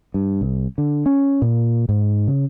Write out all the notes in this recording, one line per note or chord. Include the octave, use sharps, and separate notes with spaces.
G2
C2
D3
C#4
A#2
G#2
C#3